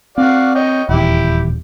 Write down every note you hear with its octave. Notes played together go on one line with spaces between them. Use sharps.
C4 F#4 D5 F5
C#5 D#5 G5
D#1 E2 E4 G4 G5